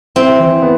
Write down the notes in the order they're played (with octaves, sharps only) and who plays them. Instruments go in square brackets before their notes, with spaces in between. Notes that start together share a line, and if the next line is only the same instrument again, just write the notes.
[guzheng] C4 [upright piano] E4
[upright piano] E3
B3